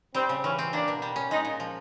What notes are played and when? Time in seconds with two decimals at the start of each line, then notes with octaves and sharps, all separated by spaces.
0.14 G3 C4
0.29 C#3
0.44 E3 C#4
0.59 C4
0.73 A#3 D4
0.88 B2
1.02 G3
1.16 C#4
1.30 G#3 D#4
1.45 A#2
1.60 F3